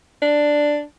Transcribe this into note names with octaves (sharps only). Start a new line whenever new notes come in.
D4